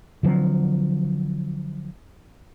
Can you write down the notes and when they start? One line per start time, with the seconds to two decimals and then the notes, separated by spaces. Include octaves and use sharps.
0.23 D3 F3 F#3 C4